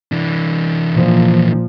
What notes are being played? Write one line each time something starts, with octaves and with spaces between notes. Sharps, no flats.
E3 D4
A#2 F3